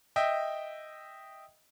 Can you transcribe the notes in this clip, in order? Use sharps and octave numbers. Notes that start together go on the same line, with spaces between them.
D#5 E5 G5